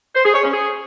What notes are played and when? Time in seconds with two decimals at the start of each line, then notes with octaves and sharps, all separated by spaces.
0.15 C5
0.25 G#4
0.34 C#5
0.43 C#4
0.53 G#4